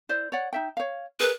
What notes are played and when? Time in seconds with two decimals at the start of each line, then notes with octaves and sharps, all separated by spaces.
0.09 E4 C5 D5
0.32 C#5 D5 F#5
0.53 D#4 E5 G5
0.77 C#5 F5
1.20 G#4 A#4 B4